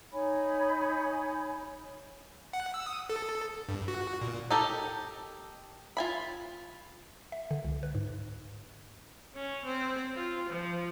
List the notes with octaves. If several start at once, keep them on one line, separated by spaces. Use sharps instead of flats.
D#4 C#5 G#5 B5
F#5
E6
D#6
A4
G2
F#4
A#2
D#4 G4 A4 A#4
F4 G#5 B5
E5
D3
C#2
B4
G#2
C#4
C4
F4
F3